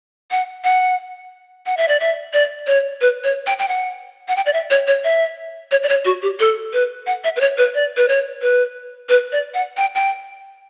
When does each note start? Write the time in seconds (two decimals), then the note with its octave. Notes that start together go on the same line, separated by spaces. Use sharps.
0.31 F#5
0.64 F#5
1.66 F#5
1.77 E5
1.88 D5
2.00 E5
2.33 D5
2.67 C#5
3.01 B4
3.24 C#5
3.47 G5
3.59 G5
3.68 F#5
4.28 F#5
4.36 G5
4.46 D5
4.53 E5
4.70 C#5
4.87 C#5
5.04 E5
5.71 C#5
5.83 D5
5.89 C#5
6.05 F#4
6.22 G4
6.40 A4
6.73 B4
7.07 F#5
7.24 E5
7.36 B4
7.41 C#5
7.58 B4
7.74 D5
7.97 B4
8.08 C#5
8.42 B4
9.09 B4
9.32 D5
9.54 F#5
9.77 G5
9.95 G5